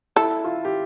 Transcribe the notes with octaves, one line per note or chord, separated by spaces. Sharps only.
E4 A4
F4
G4